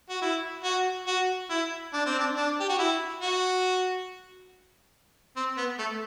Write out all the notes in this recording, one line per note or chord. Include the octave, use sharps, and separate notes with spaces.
F#4
E4
F#4
F#4
E4
D4
C4
D4
D4
G4
F#4
E4
F#4
C4
B3
A3